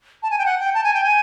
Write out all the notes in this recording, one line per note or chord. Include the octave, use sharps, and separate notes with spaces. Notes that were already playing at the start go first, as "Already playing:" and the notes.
A5
G#5
G5
F#5
G5
A5
G#5
G5
G#5